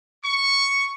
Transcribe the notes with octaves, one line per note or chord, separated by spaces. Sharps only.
C#6